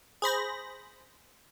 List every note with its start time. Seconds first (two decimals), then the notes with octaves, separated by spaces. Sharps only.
0.22 G#4 C5 B5 A#6